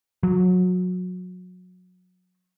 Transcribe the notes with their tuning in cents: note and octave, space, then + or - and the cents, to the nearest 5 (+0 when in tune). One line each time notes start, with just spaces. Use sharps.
F#3 -30